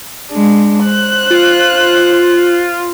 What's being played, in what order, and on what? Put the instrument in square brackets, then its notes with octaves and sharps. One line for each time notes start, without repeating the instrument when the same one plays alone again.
[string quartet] G#3 D4
C5 F#6
[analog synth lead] F4